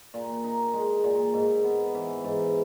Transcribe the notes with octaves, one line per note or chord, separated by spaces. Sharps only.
A#2
D#4
G#3
A#2
G#2
B3
E3
G#2